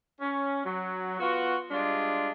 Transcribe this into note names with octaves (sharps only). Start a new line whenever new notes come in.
C#4
F#3
B3 F4 F#4
G3 G#3 D4 F4